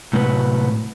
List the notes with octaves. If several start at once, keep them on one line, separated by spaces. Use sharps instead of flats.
A2 C3 F#3 F#4 A#4 B4